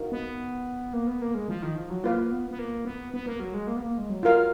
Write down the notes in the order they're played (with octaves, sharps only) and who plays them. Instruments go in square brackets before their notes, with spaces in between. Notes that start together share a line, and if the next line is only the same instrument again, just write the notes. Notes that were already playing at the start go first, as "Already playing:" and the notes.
Already playing: [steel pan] D#4 F#4 A#4 F5
[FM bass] B3
A#3
B3
A#3
G#3
F3
D#3
F3
F#3
[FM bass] A#3 [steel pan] F4 B4 F5
[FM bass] B3
B3
A#3
B3
B3
A#3
F#3
G#3
A#3
B3
A#3
G#3
F#3
[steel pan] F4 A#4 F5